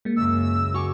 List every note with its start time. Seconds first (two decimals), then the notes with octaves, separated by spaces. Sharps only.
0.05 G#3 A#3
0.17 C#2 F#2 E6
0.74 F#4 G#5 C#6 D6